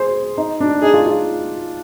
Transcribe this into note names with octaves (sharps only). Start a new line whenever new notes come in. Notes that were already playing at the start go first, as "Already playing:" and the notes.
Already playing: G#4 C5
D#4
D4
D#4 G#4
F4
F4